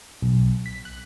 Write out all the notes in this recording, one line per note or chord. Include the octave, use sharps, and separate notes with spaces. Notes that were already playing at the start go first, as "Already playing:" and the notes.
B1
B6
F#6